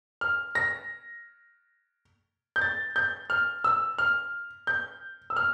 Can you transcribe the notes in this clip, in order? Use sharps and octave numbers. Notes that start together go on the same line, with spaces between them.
F6
A#6
G6
A6
G6
F6
E6
F6
G6
E6
F6